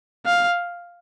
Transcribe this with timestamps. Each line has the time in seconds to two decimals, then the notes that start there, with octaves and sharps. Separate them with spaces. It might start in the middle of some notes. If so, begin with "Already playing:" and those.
0.26 F5